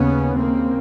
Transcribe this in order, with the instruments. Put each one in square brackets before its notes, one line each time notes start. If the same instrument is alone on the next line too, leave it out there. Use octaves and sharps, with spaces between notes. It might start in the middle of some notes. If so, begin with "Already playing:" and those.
Already playing: [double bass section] D#2 C#3 B3 C#4
A#3 C4